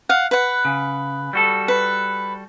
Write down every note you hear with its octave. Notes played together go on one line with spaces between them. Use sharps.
F5 F#5
B4 F#5
C#3
G3 F#4 A4
B4